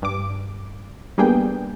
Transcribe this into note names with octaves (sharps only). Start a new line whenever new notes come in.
G2 D6
G3 A#3 B3 D4 G#4 G5